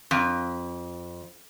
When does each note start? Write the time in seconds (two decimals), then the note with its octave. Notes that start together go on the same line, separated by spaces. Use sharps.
0.11 F2